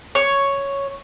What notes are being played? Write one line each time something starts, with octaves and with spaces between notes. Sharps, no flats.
C#5